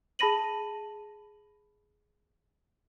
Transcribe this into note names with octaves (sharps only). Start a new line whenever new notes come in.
G#4 A5 B5 A#6 D#7 F#7